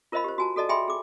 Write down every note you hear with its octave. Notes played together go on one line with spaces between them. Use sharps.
F4 A#4 C5 D#5 F5 B5
G4 C5
F#4 G#5 A5
F#4 A4 D5 D#5 A5
G#4 E5 G5 G#5 B5 C6
G#4 D6